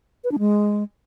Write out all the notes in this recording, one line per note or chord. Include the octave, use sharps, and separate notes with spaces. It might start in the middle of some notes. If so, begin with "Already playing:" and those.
B4
D4
G#3